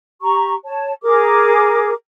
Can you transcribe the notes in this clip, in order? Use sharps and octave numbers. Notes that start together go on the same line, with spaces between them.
G4 A#5 C#6
C#5 A5
G#4 A#4 D6